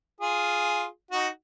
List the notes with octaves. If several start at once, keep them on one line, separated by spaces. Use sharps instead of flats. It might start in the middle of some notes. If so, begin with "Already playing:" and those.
F4 G#4
D#4 F#4